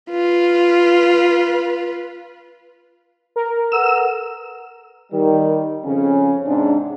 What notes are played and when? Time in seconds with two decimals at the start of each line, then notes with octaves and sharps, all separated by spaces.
0.11 F4 B4
3.36 A#4
3.72 A4 B4 F#5 E6
5.11 D#3 G3
5.83 F2 C#3 C#4
6.45 G#2 C3 C#4 D4